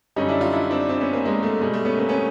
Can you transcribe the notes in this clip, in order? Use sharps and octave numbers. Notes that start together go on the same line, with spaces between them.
F#2 D3 G3 C#4 D#4
D4 E4
D#4 F4
D4 E4
C4 D4
C4 D4
B3 C#4
A#3 C4
G#3 A#3
A3
B2 G3 G#3
A3
B3 C#4
A#3 C4
B3 C#4